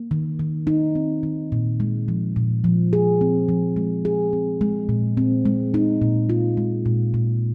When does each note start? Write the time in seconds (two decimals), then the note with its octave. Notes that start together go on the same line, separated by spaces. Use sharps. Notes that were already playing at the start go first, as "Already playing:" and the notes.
Already playing: A#3
0.11 D#3
0.39 D#3
0.67 D#4
0.95 C4
1.23 D#3
1.52 A#2
1.80 G#3
2.08 F3
2.36 A#2
2.64 F3
2.93 G#4
3.21 C4
3.49 F3
3.76 G#3
4.05 G#4
4.33 C4
4.61 G#3
4.89 A#2
5.17 C4
5.45 G#3
5.74 D#4
6.02 A#2
6.30 F4
6.57 G#3
6.86 A#2
7.14 A#2